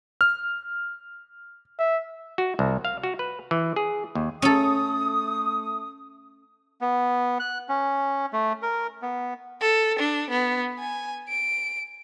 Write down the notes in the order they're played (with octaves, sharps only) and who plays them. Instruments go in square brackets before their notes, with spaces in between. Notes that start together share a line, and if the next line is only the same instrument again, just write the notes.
[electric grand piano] F6
[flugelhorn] E5
[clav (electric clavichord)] F#4
C2
F5
F#4
B4
E3
G#4
D#2
[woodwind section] A3 D#6 [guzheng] C#4 A4
[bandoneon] B3
F#6
C#4
A3
A#4
B3
[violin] A4
D4
B3
G#5
D7